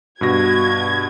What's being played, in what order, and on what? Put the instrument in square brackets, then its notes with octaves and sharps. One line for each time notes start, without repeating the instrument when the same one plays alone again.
[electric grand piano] G2 B2 A#6 [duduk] F#4 [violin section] G#6